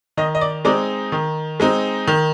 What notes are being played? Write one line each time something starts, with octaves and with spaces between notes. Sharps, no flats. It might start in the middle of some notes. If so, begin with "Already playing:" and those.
D#3 D#5
D#5
D5
G#3 C4 D#4 D5
D#3
G#3 C4 D#4
D#3